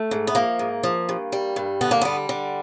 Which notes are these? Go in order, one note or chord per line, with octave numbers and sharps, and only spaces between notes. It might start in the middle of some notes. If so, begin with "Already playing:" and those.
Already playing: A3
G#2
B3
F3 A#3
G#2
F3
G2
G3
G2
D3 B3
A#3
G3 B3
D3